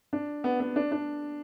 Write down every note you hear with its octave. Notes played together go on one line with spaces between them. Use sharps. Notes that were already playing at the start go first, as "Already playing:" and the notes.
D4
B3
B3
D4
D4